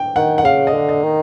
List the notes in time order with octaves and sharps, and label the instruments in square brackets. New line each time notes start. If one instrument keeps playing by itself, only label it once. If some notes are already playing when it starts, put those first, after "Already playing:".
Already playing: [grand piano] G5
[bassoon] D#3 [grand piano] F#5
[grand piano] F#5
[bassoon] C#3 [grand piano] F5
[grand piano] D#5
[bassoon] D3
[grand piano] D#5
[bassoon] D#3